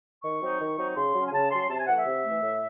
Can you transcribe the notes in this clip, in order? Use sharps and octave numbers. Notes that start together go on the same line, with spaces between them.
D#3 C#6
F#3 C4 D#4
D#3
F#3 C4 D#4
C#3 C6
F#3 C#4
G#5
C#3 A5
F#3 C#4 C6
C3 A5
G#5
E3 A3 F#5
E5
C3
A3
E3
A2